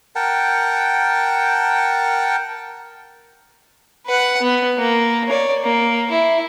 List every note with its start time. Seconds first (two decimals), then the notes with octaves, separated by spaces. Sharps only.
0.16 A#4 F#5 G5 A5
4.07 B4 F#5
4.42 B3
4.78 A#3
5.28 C#5 D5
5.63 A#3
6.11 E4